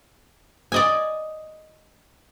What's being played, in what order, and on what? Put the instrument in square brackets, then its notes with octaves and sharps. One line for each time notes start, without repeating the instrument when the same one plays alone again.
[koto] D5 D#5 G#5